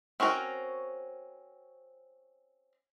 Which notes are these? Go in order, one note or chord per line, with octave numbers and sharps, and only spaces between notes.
C4 C#4 F#4 A#4